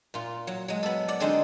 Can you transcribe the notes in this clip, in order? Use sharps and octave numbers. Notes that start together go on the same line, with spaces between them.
A#2 F4
F#3
F#3 G#3
B3 A4
D5 F#5
D3 G#3 C4 D4 D#4